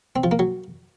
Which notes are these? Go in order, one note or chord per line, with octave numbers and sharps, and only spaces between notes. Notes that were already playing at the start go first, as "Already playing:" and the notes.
C4
F3
A#3
F#3